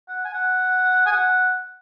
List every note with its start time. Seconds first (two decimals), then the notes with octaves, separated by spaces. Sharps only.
0.08 F#5
0.25 G#5
0.34 F#5
1.06 G#5
1.12 F#5